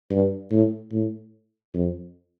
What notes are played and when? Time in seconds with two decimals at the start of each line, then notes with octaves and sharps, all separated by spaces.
0.11 G2
0.51 A2
0.92 A2
1.74 F2